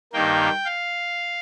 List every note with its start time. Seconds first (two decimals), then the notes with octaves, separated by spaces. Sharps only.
0.13 G2 D#3 A#3 G5
0.65 F5